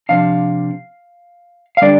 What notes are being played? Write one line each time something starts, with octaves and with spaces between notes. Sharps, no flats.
C3 F3 D4 F5
F5
D3 G3 D4 D5